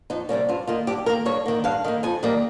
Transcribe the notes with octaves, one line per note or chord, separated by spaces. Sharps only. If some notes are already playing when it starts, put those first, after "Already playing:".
F2 D#4
C3 D#3 G3 A#3 C#4
G2 F4
D#3 A#3 F4
G2 G4
D#3 A#3 A#4
G2 C#5
D#3 A#3
G2 F5
D#3 A#3
F2 G#5
D#3 G3 A#3